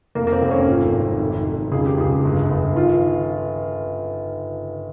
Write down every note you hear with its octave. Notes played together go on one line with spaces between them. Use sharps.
F1 A#3
A#3
C4
F1
C#4
G#1 F4
G#1
F1
F1
C#2 G#4
G4
C#2 G#4
G1
G1
D#3 F4